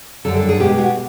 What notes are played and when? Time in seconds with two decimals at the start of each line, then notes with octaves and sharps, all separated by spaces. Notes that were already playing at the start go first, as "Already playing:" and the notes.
0.25 F#2 D3 G3 A4
0.37 A4
0.49 G#4
0.60 B2 G#3 G4
0.78 F#4